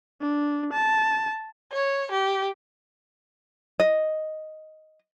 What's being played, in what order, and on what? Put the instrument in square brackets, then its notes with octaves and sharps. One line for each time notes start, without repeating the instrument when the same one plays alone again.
[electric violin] D4
A5
[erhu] C#5
G4
[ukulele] D#5